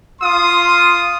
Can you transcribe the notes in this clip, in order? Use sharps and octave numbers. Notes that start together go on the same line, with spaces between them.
F4 C6 D#6